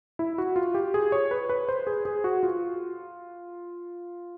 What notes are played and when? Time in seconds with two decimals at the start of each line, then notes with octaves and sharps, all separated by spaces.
0.19 E4
0.38 F#4
0.56 F4
0.74 G4
0.94 G#4
1.12 C#5
1.31 B4
1.49 B4
1.69 C5
1.87 G#4
2.05 G#4
2.24 F#4
2.43 F4